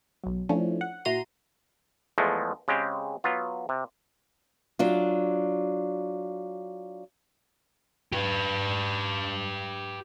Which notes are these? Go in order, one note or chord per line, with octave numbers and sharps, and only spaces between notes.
B1 F#3
F3 A3 C#4 D4 E4
F#5
A#2 E4 F#4 A#5 C6 D#7
E2 F3 G#3 A3
C#3 G#3 C4 G4
F#3 B3 F4
C3
F#3 D4 F4
G4 B4